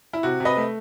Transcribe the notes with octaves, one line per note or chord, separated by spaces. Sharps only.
E4
C3 F#4
C3
B4 D#5
A3